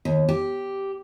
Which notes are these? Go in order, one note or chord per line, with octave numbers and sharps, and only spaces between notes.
D#2
G4